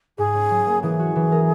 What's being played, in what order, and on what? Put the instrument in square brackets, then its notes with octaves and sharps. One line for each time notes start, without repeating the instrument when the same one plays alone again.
[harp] G#2 [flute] G#4
[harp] C#4
F#3
A#3
[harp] E3 [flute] G#4
[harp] F#4
E3
A#4